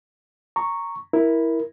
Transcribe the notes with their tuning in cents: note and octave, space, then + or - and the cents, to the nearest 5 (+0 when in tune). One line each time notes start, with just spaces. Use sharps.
A#5 -10 C#6 +0
E4 -5 A#4 +10